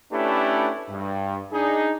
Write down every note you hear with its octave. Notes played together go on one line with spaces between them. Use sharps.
A3 C#4 D4 E4 G4 B4
G2
D4 D#4 G#4